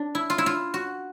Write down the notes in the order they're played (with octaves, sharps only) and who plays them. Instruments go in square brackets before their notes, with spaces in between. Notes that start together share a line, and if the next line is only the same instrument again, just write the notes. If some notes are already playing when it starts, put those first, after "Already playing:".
Already playing: [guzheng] D4
E4
F4
E4
F4
F#4